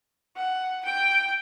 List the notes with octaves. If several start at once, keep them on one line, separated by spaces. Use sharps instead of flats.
F#5
G5